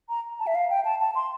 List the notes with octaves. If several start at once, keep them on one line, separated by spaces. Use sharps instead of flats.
A#5
A5
E5
F5
G5
A5
A5
C6